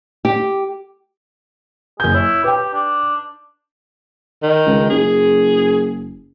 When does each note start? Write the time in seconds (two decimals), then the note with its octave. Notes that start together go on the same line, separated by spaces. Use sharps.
0.25 G4
2.00 F#1 G#4 G6
2.14 E4 C#5
2.44 G4 B4 G5
2.73 D4
4.43 D#3
4.66 C#2
4.90 F#1 G#4